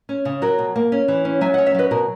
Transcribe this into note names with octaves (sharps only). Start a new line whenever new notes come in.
C#4
C#3
F#3 F#4 A#4
B2
A#3
C#4
E3
C#4
F#3 E5 G#5
D#5 F#5
C#4
C#5 E5
F#3 B4 D#5
B2 F#4 A#4